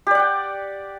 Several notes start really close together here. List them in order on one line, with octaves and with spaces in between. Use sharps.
G4 D5 F#5 G5